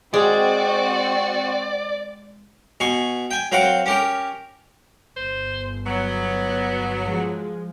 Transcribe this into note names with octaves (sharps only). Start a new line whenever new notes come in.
G#3 C4 F#4 D5
B2 G#5 C#6
G5 G#5
F#3 C4 A#4 F5 F#5
C#4 G4 A#4
G1 C5
F#3 B3
F3 G#3